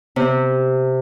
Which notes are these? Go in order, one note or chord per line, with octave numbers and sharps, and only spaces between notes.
C3